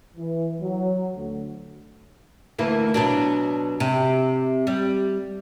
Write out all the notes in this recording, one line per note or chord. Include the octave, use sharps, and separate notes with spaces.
E3
F#3
D2
D2 E3 A#3
B2 F#3 D4
C3
G3